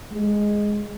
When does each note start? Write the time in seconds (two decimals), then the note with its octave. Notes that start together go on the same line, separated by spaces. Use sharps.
0.11 G#3